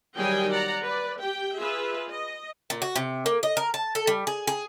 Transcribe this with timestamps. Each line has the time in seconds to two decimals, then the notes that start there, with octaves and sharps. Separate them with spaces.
0.18 D#3 F#3 G3 G#4 G5 G#5
0.50 D5 F#5 A#5
0.83 B4 D5
1.21 G4 G5
1.56 F4 G#4 B4 E5
2.09 D#5
2.70 A#2
2.82 F#4
2.96 C3
3.26 A#3
3.43 D#5
3.57 A#4
3.74 A5
3.95 A4
4.07 G3
4.27 G#4
4.47 G#4